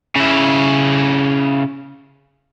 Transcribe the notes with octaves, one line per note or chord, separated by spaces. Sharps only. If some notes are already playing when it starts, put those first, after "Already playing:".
C#3 E4